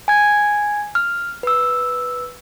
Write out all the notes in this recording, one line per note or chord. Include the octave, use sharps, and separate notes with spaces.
G#5 G#6
F6
B4 E6